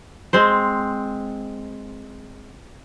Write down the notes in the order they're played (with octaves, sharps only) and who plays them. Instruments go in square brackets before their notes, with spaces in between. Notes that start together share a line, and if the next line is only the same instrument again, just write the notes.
[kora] G#3 C4 C5